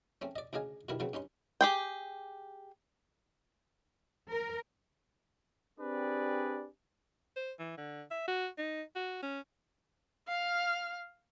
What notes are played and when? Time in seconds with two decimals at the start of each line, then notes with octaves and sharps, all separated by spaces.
0.21 A3 C4 C#4
0.36 D5 D#5
0.53 D2 C#3 D4 D#5 F5 G#5
0.89 B2 D3 D#3 G3 E4 A#4
1.00 C#3 F#3 A3 B3 C4
1.13 G2 C#4 D#4 C6
1.61 G4 G#4 G5
4.32 A#4
5.80 C4 D4 G4 G#4 B4 D5
7.36 C5
7.59 E3
7.77 D3
8.11 E5
8.27 F#4
8.58 D#4
8.95 F#4
9.23 C#4
10.28 F5 F6